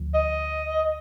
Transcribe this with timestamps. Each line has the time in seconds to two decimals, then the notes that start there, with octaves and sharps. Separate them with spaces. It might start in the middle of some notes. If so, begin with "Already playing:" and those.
Already playing: D2 F3
0.14 D#5